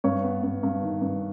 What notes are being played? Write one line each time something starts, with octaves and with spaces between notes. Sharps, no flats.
G2 C#5
B3
G2
G2
D#3
G2